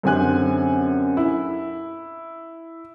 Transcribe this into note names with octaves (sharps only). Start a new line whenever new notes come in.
F#2 D3 C4 G4 G#5 F#6
E4